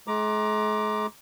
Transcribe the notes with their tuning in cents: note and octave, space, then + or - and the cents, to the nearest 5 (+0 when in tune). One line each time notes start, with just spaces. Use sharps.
G#3 +45 A#5 +20 D6 +0